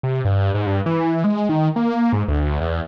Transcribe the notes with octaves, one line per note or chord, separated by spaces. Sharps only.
C3
G2
G#2
G2
E3
G#3
D#3
A#3
G#2
D2
E2